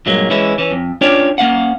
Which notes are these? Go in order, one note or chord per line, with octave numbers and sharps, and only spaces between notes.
G2 A#2 F#3 G#3 A#3
E3 G#3 C#4 E4
E3 C#4
F2
C#4 D4 F4 G4 C#5 D5
A#3 C#4 F5 F#5